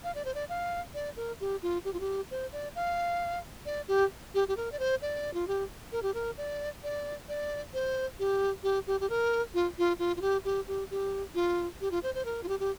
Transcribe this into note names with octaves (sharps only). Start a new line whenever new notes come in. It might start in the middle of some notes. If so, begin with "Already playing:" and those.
F5
D5
C5
D5
F5
D5
A#4
G4
F4
G4
F4
G4
C5
D5
F5
D5
G4
G4
G4
A#4
D5
C5
D5
F4
G4
A#4
G4
A#4
D5
D5
D5
C5
G4
G4
G4
G4
A#4
F4
F4
F4
F4
G4
G4
G4
G4
F4
G4
F4
C5
C5
A#4
F4
G4
G4